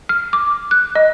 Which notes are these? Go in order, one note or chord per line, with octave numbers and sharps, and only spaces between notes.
F6
D6
F#6
D#5